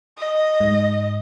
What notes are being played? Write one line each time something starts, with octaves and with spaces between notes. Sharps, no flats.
D#5
G#2